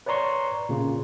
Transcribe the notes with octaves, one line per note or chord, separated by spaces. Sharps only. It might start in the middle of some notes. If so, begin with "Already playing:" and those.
B4 C#5 D5 A#5 C6 C#6
A#2 C#3